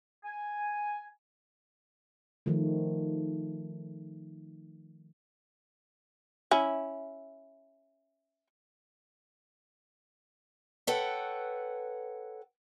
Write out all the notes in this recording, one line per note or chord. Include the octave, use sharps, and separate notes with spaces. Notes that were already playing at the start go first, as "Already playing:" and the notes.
G#5
D#3 F3 A3
C#4 E4
A4 B4 C#5 F#5 G5